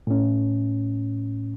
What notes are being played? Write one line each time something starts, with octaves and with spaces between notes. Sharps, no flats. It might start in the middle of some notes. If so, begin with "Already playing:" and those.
A2 C#4